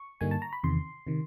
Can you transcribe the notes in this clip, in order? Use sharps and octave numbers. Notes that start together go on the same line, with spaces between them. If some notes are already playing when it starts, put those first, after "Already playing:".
Already playing: C#6
G2 D3 G3 A#3 D#4 G#5
A5
A#5
B5
E2 C3 D#3 C6
C3 D#3